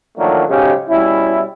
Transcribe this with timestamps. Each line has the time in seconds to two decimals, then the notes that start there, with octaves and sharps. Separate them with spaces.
0.18 D#3 F3 F#3 A3 A#3 D4
0.48 B1 G#2 C#3 G#3 C#4 G4
0.89 B2 G3 C#4 E4